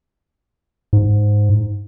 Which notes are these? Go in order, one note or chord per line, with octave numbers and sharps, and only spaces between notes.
G#2